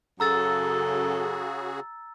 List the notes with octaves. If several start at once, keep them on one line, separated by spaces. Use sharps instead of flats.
F#2 C#3 F#4 G#4 A4 A#5 E6 A6